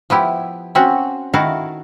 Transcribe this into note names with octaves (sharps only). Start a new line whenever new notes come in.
F3 B3 E4 G4
C4 C#4 F#4
D#3 E4 F#4 A4 F5 A#5